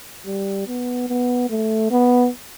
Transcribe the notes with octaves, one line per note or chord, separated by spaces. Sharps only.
G3
B3
B3
A3
B3